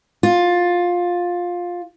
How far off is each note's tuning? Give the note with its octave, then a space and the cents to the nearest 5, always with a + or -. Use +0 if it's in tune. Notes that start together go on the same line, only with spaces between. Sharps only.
F4 +15